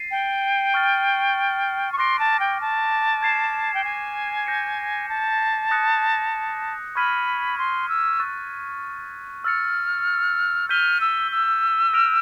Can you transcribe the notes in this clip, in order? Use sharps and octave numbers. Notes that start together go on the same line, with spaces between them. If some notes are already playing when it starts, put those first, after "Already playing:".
Already playing: A6 C7 D#7
G5
C#6 F6 A6
C#6
C6 D6 F#6 A#6 D7
A5
G5
A5
G#6 C7 E7
G5
G#5
G6 A#6 C#7
A5
D#6 F#6 A#6 C#7
B5 C#6 F6 G#6 B6 D#7
C6
E6
C#6 F#6 A6
E6 F6 A6 C#7
F6 G6 B6 D#7 G7
E6
E6
F6 A#6 D7 F7